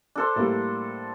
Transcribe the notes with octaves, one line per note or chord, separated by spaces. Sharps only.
D4 A4 C5
A2 G3 A#3